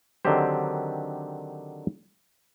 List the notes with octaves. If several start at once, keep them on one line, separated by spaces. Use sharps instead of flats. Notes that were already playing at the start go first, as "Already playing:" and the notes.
D3 D#3 F#3 C4 G4 C5